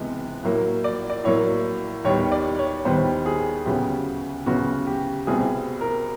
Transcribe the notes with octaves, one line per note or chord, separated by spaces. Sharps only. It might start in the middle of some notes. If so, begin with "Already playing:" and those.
Already playing: C#2 C3 E3 G#3 B3
A2 F#3 A#3
D5
D5
A2 F#3 A#3 C#5
D#2 D#3 G3 B3 C#5
D5
C#5
D#2 D#3 G3 B3 C5
G#4
D2 C#3 F#3 B3 G4
D2 C#3 F#3 B3 F#4
G4
C2 B2 G3 C4 G#4
A#4